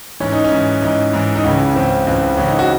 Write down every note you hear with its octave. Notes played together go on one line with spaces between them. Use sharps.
G#2 E3 C#4
D#4
C#4
G#2 E3
G#2 E3 D#4
G#2 E3
D#4
C#2 C#3 E3 C#4
C#2 C#3 E3 C4
C#2 C#3 E3
C#2 C#3 E3 C#4
D#4
F#4